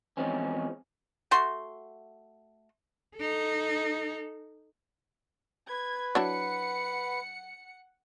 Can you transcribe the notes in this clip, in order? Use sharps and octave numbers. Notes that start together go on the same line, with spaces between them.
E2 F3 G#3 C4 C#4
A3 F#4 C6
D#4 A4
B4 G#6
F#3 D4 E4 F#5 C#7